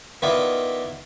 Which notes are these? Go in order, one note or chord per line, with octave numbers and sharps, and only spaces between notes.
D#3 B3 E4 F4 B4 D5